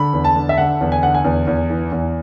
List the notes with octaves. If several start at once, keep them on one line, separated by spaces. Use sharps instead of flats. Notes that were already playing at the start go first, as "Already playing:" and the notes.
Already playing: D3 B5
E2
A5
D3
E5
D3 F#5
E2
G#5
D3 F#5
G#5
E2
E2
E3
E2